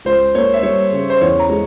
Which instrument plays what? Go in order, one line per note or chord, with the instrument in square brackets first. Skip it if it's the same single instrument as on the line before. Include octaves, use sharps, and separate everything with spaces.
[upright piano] C#2 [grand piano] C5
[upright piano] A#3 [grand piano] C#5
[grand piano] E5
[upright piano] G3 [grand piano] C#5
[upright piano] C#3
[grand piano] C5
[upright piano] E2 [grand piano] C#5
[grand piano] A#5
[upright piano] G#3